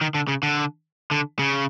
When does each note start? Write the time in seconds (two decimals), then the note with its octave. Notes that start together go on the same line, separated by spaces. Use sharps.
0.01 D#3
0.15 D3
0.28 C#3
0.43 D3
1.11 D3
1.39 C#3